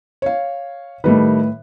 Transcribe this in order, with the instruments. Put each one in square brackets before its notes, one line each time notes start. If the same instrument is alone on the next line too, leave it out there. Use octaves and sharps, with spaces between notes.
[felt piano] C#5 F5
[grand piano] A2 B4 [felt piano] D#3 G3 A3